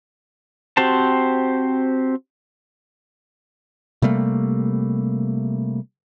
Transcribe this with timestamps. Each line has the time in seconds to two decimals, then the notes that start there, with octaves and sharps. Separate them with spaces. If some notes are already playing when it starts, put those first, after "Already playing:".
0.77 C4 F#4 G4 C5 A5
4.02 C3 G3 A3 A#3